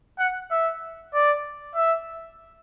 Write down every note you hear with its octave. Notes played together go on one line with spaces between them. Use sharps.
F#5
E5
D5
E5